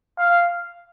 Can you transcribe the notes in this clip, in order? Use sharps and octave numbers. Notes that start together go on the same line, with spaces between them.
F5